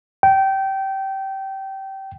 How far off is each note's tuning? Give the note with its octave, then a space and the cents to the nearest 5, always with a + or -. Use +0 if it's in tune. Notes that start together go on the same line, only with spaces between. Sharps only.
G5 -20